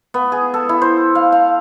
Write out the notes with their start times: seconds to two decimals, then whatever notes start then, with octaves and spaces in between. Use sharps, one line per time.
0.14 B3
0.32 G#4
0.54 A4
0.69 E4
0.82 C5
1.15 F5
1.32 F5